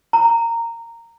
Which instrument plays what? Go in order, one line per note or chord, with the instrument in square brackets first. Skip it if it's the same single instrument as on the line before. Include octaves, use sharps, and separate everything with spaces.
[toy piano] A#5